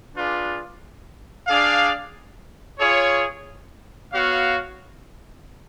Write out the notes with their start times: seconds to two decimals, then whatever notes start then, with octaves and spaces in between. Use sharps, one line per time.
0.15 D4 F4 G#4 B4 D5
1.47 D4 G#4 D5 F5
2.79 F4 G#4 C#5
4.12 B3 F#4 C#5 F5